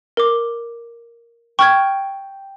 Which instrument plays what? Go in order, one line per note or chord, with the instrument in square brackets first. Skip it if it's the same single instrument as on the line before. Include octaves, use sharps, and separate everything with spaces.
[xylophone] A#4 D6
[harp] G5 [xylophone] C#6 F6 G#6